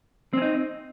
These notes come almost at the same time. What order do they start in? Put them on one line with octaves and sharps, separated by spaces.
C4 C#4 D#4